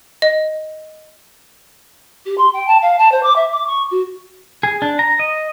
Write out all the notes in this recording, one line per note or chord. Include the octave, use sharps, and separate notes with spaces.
D#5
G4
C6
G5
A5
F5
A5
C5
D6
E5
D6
C#6
F#4
G#4
D4
A#5
D#5